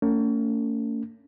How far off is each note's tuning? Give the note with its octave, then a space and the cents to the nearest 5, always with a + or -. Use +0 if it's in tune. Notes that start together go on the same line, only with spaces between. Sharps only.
A3 +45 C#4 +30